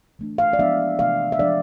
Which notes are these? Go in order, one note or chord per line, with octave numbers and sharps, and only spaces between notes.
E3 A3 D4
F5
D5
F3 G#3 B3 D4 E5
C3 E3 A3 F5
E5
F3 G#3 D4 D5